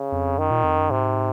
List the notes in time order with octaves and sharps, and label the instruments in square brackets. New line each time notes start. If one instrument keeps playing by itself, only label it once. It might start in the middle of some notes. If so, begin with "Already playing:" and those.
Already playing: [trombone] C#3
[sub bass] F2
[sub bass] F#2 [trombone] D#3
[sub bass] A#2
F2
F#2
[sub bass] G#2 [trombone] C3